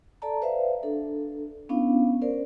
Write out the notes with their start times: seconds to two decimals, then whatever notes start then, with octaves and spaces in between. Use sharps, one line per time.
0.22 A4 D5 A5 A#5
0.42 B4 C5 D5 E5 F5
0.83 D4 A4
1.69 B3 C#4 D4 E4 F5
2.21 C#4 A#4 C5 D5